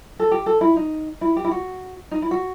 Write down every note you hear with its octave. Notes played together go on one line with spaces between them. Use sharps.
A4
G4
A4
E4
D#4
E4
G4
E4
F#4
D#4
E4
F#4